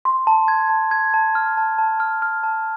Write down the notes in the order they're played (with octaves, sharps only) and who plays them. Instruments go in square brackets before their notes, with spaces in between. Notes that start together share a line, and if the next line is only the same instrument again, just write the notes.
[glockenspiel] C6
A5
G#6
A5
G#6
A5
F6
A5
A5
F6
F6
A5